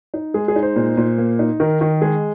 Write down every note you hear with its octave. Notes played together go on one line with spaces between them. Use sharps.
D#4
G#3 G#4
G#4
D#4
C5
A#2
A#2
A#3
D#4
D#3 A#4
D#3
G#3 G#4